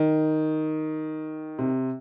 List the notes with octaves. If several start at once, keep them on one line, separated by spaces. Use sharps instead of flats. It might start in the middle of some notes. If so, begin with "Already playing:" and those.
Already playing: D#3
C3